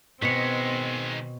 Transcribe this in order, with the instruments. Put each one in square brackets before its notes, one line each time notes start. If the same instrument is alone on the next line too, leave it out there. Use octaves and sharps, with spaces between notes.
[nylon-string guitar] B2 [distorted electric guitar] D#3 G#3 [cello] C4 [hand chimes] B6 C#7